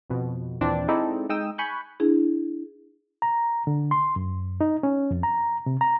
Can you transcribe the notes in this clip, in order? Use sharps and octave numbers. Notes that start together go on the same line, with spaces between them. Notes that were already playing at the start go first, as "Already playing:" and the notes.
F2 B2
D#2 A#2 E3 C4 D4
G#3 C4 D#4 E4 A4 D5
G#3 D#4 G5 D#6 E6 E7
G#5 B5 C#6 F#6 G6
D4 E4 G#4
A#5
D3
C6
F#2
D#4
C#4
F2
A#5
C3
A#5